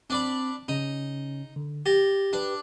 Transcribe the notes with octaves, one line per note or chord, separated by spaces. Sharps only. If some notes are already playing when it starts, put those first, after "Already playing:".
C4 D4 D5 B5
C#3 C#4 D#4
D3
G4 A6 A#6
D4 G4 B4